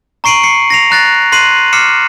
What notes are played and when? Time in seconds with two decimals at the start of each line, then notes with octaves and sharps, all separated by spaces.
0.24 A#5 C#6 C7 D7 D#7 F#7
0.43 C7 C#7
0.70 A#6 C7 F7
0.91 A#5 F#6 A6 A#6
1.32 C6 F#6 C7 D#7 F#7
1.73 D6 F6 C7 C#7 E7